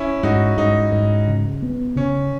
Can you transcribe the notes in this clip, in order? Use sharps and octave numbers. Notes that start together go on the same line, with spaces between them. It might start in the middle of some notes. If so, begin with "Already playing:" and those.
Already playing: C#4 E4
G#2 D#4 F#4
G#2 D#4
G#2
C#3
B3
C#3 C#4